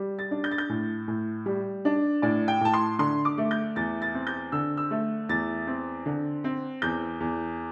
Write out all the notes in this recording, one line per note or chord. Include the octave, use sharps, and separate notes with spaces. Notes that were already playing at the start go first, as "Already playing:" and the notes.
Already playing: G3
A6
D4
G6
A6
G6
A2
A2
G3
D4
A2 D5
G5
A2 A5
C6
D3 C6
D6
A3
G6
E2 A6
A6
C4
G6
D3 E6
E6
A3
E2 A6
C4
D3
C4
E2 G6
E2